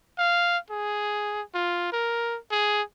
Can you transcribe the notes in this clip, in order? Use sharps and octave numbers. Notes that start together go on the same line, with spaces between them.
F5
G#4
F4
A#4
G#4